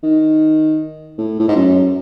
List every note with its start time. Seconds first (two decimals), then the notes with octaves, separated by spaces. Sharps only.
0.03 D#3
1.18 A2
1.40 A2
1.48 G#2
1.56 F#2